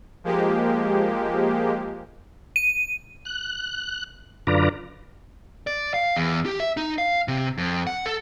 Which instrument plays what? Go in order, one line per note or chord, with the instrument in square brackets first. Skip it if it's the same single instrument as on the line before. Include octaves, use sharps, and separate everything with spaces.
[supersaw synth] F3 G#3 A#3 G4
[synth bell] D#7
[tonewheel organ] F#6
F#2 D3 F4 B4 D5 A#5
[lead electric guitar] D5
F5
E2
G4
E5
D#4
F5
C3
F2
F#5
A4